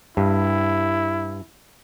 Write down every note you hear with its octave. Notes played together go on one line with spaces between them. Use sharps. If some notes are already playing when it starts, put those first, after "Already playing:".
G2 E4